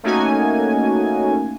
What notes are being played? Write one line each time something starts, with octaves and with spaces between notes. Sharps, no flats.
A3 A#3 C#4 D#4 F#4 G#5